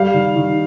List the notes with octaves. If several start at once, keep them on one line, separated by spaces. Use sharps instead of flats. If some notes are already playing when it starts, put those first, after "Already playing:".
Already playing: G3 F5
D#3
D#3